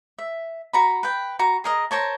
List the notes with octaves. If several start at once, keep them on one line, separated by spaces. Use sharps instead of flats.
E5
F#4 A#5 B5
B4 G5
F#4 A#5
G#4 A#4 D#5
A#4 C5 C#5 A5